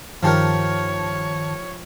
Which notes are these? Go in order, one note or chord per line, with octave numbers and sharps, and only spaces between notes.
G2 D#3 F3 G4 A#4 C#5 A5